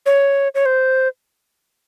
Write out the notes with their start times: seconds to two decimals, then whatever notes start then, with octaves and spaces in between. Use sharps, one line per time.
0.06 C#5
0.55 C#5
0.66 C5